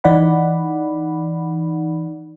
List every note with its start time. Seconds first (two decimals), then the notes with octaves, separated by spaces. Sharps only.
0.04 E3 D#4 D5 F#5 B5